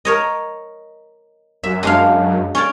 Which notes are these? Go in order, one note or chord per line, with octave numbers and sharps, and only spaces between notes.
A#4 C#5 D#5
F#2 E5
G#3 D4 F5
C#4 C#5 D5